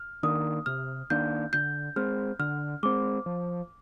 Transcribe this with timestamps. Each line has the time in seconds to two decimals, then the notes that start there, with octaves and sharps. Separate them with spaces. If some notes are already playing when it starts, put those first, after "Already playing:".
Already playing: F6
0.23 D#3 A#3 D4 D#6
0.66 C3 F6
1.10 D#3 A#3 D4 G6
1.53 D3 G6
1.96 G#3 C4 F6
2.39 D3 F6
2.83 G#3 C4 D6
3.26 F3